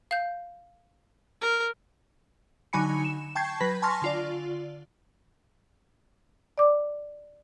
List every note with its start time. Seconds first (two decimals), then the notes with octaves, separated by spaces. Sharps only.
0.11 F5 G6
1.42 A#4
2.73 D3 F#3 D#4 G#5 B5 C#7
3.04 E7
3.35 G5 A5 C#6 G6 G#6 C7
3.60 F#3 B4 B5 A#6 B6
3.82 G#5 A5 C6 C#6 F6 A#6
4.02 D3 F4 D5
6.58 D5 D6